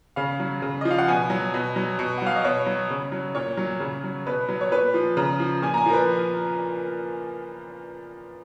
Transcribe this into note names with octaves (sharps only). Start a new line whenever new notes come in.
C#3 F5
F#3
C#3
D#5
F3
F5
F#5
B2 G#5
F#3
B2
F#3
B2
F#5
F#3 F5
D#5
B2 C#5
F#3
C#3
F#3
A#2 C#5
F#3
C#3
F#3
B2 B4
F#3
C#5
A#2 B4
F3
C#3 A#5
F3
A#2 G#5
A#5
G#5
F3 A#4
B4